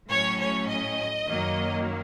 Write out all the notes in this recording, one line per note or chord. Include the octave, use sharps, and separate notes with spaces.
A2 F#3 A3 C#4 C#5
C#5
D#5
F#2 D#3 F#3 A#3